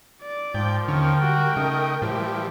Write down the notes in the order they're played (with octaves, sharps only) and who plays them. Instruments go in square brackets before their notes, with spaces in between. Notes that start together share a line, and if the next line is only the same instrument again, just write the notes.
[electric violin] D5
[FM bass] G#2 [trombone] F3 [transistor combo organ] G5
[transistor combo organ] D#2 C#4 [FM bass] D3 [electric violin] A#4 G5
[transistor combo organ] G3 [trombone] F#4
[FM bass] C#3 [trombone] A3 [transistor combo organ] D#4
[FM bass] A2 [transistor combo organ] E3 G3 [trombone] F3